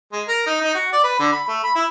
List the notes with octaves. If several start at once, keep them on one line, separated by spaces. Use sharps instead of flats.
G#3
A#4
D#4
D#4
F#4
D5
B4
D3
B5
A3
B5
E4